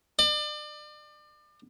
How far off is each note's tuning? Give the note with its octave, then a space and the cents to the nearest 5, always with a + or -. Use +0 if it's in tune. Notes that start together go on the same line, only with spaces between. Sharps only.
D5 +35